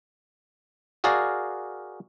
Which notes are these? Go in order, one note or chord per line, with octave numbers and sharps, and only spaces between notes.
F#4 G#4 A#4 D5 F5